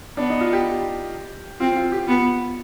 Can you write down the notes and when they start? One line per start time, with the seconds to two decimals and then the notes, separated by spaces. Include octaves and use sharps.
0.17 B3 D4
0.30 D#4
0.41 F4
0.53 G4
1.60 C4 F4
1.76 F4
1.92 G4
2.07 B3 F4